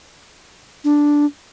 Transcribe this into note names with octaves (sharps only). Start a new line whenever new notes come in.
D4